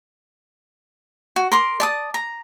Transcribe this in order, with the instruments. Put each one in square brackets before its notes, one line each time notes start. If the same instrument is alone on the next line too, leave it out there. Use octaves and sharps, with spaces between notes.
[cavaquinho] F#4
A#4 C6 D6
D5 A5 D#6
A#5